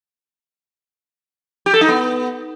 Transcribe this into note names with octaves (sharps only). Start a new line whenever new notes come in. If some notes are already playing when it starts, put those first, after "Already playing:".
G4
A4
D#4
B3